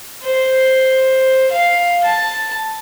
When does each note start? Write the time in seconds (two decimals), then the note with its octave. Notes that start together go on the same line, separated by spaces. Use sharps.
0.24 C5
1.51 F5
2.04 A5